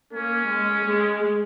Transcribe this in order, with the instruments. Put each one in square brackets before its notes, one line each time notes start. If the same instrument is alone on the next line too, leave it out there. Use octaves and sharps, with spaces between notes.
[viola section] A#3 [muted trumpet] C#4
[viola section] G#3
G#3